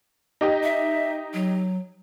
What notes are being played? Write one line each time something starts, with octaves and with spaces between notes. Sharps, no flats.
D#4 G4 D#5
E5
F#3